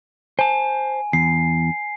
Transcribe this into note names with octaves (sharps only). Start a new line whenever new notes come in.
C5 G#5 A5
E2 C7